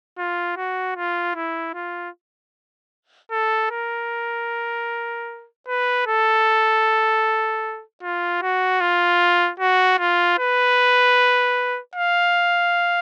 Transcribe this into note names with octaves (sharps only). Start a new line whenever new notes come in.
F4
F#4
F4
E4
F4
A4
A#4
B4
A4
F4
F#4
F4
F#4
F4
B4
F5